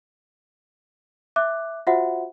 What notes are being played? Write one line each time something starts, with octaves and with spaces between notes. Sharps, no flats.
E5 D6 F#6
F4 F#4 C5 E5 F#5